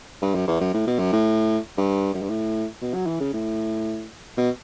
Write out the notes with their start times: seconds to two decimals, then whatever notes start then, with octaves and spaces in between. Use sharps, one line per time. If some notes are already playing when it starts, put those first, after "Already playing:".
0.22 G2
0.35 F#2
0.48 E2
0.61 F#2
0.74 A2
0.87 B2
0.99 F#2
1.13 A2
1.78 G2
2.14 F#2
2.22 G2
2.29 A2
2.82 B2
2.94 F#3
3.07 E3
3.20 C#3
3.33 A2
4.37 B2